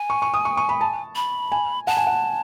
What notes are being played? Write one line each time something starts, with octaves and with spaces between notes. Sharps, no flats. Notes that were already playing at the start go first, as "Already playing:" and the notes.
Already playing: G#5
C#6
C#6
D#6
C#6
C#6
B5
A5
B5
G#5
F#5 A5
G#5
F#5